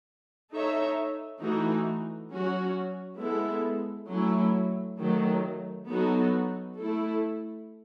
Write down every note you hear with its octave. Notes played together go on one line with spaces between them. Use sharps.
D#4 A4 C#5 E5
E3 A3 D#4 F#4
F#3 C#4 F#4
G#3 B3 E4 A4 E5
F#3 A3 C#4 E4
D#3 F#3 A3
F#3 B3 D#4 F#4 A4
A3 E4 A4